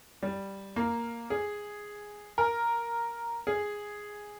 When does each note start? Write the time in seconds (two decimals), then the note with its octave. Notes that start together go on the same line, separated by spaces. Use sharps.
0.23 G3
0.76 A#3
1.30 G#4
2.38 A#4
3.47 G#4